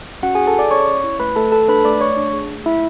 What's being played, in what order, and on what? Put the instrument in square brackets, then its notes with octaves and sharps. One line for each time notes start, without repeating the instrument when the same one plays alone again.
[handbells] C#4 F#4 F#5
E4 G#4 G#5
A4 A5
G#4 D5 D6
C#4 C#5 C#6
C#4
E4
A3 B4 B5
A3 A4 A5
A3 A4 A5
D4 B4 B5
A3 D5 D6
A3 C#5 C#6
D4
G#4
A3
A3 E4 E5